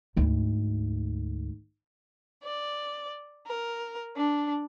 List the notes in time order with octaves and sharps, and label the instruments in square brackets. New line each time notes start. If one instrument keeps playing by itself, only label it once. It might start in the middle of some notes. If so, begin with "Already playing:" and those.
[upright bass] D2 G#2
[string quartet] D5
A#4
D4